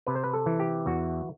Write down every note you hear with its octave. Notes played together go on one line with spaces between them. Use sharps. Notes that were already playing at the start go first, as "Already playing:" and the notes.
C3 B4
C5
B4
A4
E3
G4
E2 F#4